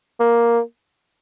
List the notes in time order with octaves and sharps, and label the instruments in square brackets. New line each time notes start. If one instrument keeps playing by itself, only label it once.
[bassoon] A#3